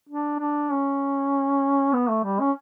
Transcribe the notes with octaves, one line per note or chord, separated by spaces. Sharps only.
D4
D4
C#4
B3
A3
G3
C#4